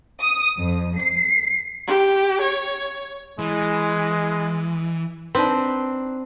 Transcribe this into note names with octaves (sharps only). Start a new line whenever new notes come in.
D#6
F2
C7
G4
C#5
E3 G#3
C4 D4 D#4 B4